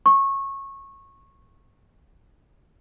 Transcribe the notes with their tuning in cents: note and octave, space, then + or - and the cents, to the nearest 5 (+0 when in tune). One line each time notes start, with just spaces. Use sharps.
C#6 -20